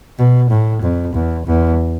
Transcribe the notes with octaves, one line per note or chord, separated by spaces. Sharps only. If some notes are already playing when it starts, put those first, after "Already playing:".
B2
A2
F2
E2
E2